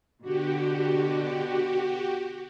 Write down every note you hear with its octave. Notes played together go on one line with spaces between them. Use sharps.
B2 D3 F#4 G4